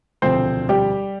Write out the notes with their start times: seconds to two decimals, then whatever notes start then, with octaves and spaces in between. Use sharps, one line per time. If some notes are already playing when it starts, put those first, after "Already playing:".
0.22 E1 D2 C3 F3 C4 C5
0.69 G3 G4